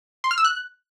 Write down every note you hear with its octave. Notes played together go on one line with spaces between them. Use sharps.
C6
F6
E6
F#6